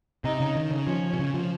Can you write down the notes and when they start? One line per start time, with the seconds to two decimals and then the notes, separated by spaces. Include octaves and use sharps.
0.24 C3 D#4
0.40 C#3
0.56 D#3
0.71 C#3
0.87 F3 C#4
1.13 C3
1.19 C#3
1.34 F3